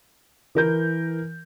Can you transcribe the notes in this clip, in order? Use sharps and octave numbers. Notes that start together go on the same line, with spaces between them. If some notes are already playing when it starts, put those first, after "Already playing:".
E3 A#4 G6